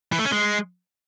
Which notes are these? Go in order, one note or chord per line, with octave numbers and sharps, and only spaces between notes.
E3
A3
C#4
G#3